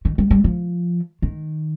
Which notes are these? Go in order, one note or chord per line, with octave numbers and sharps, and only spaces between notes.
D#3
G3
G3
F3
D#3